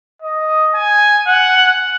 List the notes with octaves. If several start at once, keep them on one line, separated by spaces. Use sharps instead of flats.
D#5
G#5
F#5